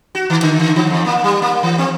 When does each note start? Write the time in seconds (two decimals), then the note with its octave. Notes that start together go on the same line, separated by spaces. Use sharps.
0.15 F#4
0.30 D#3
0.42 D3
0.59 D3
0.76 E3
0.90 F2
1.06 A#3
1.24 G3
1.42 A#3
1.63 E3
1.78 C4